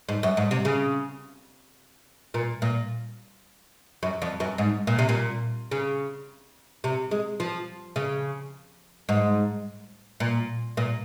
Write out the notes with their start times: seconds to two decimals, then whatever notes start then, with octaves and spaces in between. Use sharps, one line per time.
0.09 G#2
0.23 F#2
0.37 G#2
0.51 C3
0.65 C#3
2.34 A#2
2.62 A#2
4.03 F#2
4.22 F2
4.40 F#2
4.58 G#2
4.87 A#2
4.99 C3
5.09 A#2
5.71 C#3
6.84 C3
7.11 G#3
7.40 F3
7.96 C#3
9.09 G#2
10.20 A#2
10.77 A#2